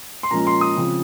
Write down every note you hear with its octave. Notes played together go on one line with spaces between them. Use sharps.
C6
A#2 F3 G#3 C#4 A#5
C6
D#6
C#3 F3 C4